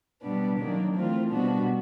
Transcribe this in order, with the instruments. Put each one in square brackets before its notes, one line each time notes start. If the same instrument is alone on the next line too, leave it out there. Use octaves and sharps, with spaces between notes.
[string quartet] B2 G3 B3 D4
D#3 F#3 A#3 D4
E3 A3 C4 F4
B2 G3 B3 D4 F#4